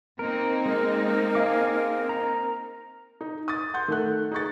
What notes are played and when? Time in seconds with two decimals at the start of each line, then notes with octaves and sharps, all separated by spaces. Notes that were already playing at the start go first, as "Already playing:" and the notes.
0.19 A#3 C4 D#4 A#4
0.66 G#3 A#4
1.35 G#4 F5 D6
2.09 A#5
3.21 D#4
3.48 D#6 A6
3.74 F#5 C6 G6
3.88 D#3 A3 F#6
4.31 D#4 G#4 C#6 A6